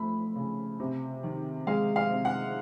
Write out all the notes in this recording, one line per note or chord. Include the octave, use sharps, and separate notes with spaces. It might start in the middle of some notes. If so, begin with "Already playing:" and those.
Already playing: F3 A3 B5
C#3
C3
D#3
G#3 F5
F5
C3
F#5